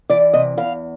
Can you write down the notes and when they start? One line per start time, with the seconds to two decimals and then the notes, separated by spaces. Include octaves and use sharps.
0.10 E3 D5
0.33 C3 D#5
0.57 E2 F5